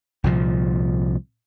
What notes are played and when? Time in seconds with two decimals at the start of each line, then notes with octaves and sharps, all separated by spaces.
0.24 C2 A#2 F3